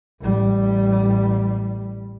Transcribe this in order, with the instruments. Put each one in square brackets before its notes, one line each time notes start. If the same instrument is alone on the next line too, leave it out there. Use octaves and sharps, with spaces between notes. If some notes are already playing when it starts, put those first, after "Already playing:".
[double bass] A1 G3